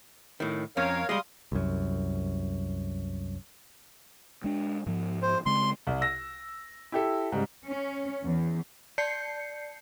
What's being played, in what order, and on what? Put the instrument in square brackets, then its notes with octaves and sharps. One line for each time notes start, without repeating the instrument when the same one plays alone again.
[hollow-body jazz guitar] A2 D#3
[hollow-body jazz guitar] F2 C#4 [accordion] A#4 C#5 F5
[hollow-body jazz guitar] G3 G#3 [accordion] F5 C6 D#6
[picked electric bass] C2 F#2
[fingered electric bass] G#3 D4
G#2 F3
[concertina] C5
[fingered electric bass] C#3 G#3 C4 [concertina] C6
[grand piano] C2
E6 A#6
E4 G4 A4
G#2 C#3 G3
[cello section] C#4
E2
[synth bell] D5 A5 G6 C7 C#7